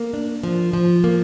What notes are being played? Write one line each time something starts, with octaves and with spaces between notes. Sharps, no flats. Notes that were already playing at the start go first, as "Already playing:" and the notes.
Already playing: A#3
D4
F3
F3
A#3